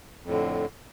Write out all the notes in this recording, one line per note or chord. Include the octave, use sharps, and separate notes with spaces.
F2 A2 D3